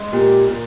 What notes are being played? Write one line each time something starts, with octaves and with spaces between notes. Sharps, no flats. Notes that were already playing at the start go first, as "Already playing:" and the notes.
Already playing: G#3
A#2 G4
A#2